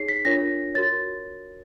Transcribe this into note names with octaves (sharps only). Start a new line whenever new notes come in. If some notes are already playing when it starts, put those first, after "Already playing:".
Already playing: D#4 G#4 C#5 C7
B6
D4 F4 A#4 C#5 A#6
F#4 A#4 C#5 A6